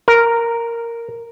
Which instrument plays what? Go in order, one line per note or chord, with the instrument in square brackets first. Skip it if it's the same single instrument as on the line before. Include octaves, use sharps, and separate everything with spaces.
[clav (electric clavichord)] A#4